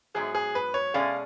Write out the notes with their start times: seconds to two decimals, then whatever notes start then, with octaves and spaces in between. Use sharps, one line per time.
0.14 G#2 F#3 B3 G#4
0.35 G#4
0.55 B4
0.74 C#5
0.94 B2 G#3 C#4 G#4 D5 F5